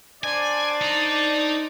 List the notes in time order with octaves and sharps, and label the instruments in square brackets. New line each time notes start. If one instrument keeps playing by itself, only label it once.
[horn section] D4 C5 D5 [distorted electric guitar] G#5
[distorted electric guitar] D#4 A#5